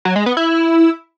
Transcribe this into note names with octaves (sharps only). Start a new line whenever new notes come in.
F#3
G#3
B3
E4